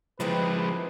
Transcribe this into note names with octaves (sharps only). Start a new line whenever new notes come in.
D#3 F3 G#3 C4 E4 B4